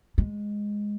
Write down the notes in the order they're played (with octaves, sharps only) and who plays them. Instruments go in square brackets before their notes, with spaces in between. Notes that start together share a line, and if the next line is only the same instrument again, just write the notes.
[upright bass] G#3